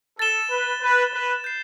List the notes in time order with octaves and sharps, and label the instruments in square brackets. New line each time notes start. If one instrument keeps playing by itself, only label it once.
[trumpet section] A4 [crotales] A6 E7 G7
[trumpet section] B4
B4
B4
[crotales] G6 C7